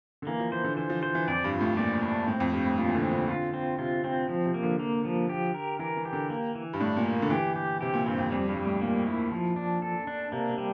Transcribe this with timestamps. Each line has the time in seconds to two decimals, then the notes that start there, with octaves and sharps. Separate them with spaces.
0.22 D3
0.27 E3 A#3
0.40 F3
0.52 E3 C5
0.64 D3
0.77 E3 C5
0.90 F3
1.02 F3 C5
1.15 E3
1.28 F2 D5
1.44 G2
1.52 F4
1.61 A2
1.77 A#2 D5
1.94 A#2
2.03 D4
2.27 A2 C4
2.40 F2
2.53 G2 C4
2.66 A2
2.78 A#2 F4
2.88 E3
2.95 D3
3.03 C4
3.11 D3
3.28 D3 F4
3.54 C4
3.79 C3 F4
4.04 C4
4.29 F3
4.46 C3
4.54 A#3
4.63 D3
4.79 A#3
5.05 F3
5.29 G4
5.54 A#4
5.79 E3 A#4
5.97 E3
6.05 G4
6.13 D3
6.30 A#3
6.55 E3
6.73 G2
6.80 A2 D4
6.97 A#2
7.05 A#3
7.22 D3
7.30 E3 G4
7.56 G4
7.81 C3 G4
7.94 A#2
8.06 G2 C4
8.18 F2
8.31 F2 G3
8.49 G2
8.57 G3
8.65 A2
8.81 A#2 A#3
9.07 E4
9.31 F3
9.56 D4
9.82 A4
10.07 D4
10.32 C3 A#3
10.49 C3
10.58 G3